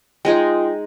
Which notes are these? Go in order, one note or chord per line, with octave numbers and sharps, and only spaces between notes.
G#3 D#4 F4 G#4 G5